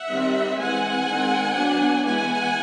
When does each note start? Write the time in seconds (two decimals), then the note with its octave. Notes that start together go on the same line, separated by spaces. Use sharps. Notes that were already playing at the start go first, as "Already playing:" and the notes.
Already playing: E5 F#5
0.10 D#3 G3 C4
0.58 E3 G#3 C4 F#5 G#5
1.07 D#3 G#3 C4
1.57 F#3 B3 D4
2.05 E3 G#3 B3 F#5 G#5